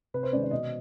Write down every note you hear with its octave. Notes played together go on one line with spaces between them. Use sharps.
C3 B4
C5
D#3 G#3 C#4 D5
D5
B2 D#5